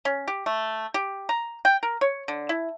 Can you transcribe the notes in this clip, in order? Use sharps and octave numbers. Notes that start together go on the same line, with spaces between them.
C#4
G4
A3
G4
A#5
G5
A#4
C#5
D3
E4